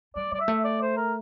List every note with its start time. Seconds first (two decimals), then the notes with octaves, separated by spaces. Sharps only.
0.16 G3 D5
0.32 G3 D5
0.40 E5
0.48 A3
0.64 D5
0.81 C5
0.97 A#4